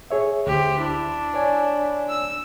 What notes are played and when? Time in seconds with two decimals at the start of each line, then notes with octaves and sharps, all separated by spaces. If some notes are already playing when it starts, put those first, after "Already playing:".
0.11 G#4 C#5 E5
0.47 D2 G4 C5
0.79 D4 E4
1.34 C#5 D5 G#5
2.10 E6